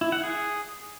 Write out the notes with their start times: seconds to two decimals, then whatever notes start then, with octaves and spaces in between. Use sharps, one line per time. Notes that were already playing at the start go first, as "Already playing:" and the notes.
0.01 E4
0.12 F#5
0.23 G#4